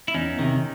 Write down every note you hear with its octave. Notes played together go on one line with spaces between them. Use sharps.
E4
E2 C#4 D#4
C3 D#3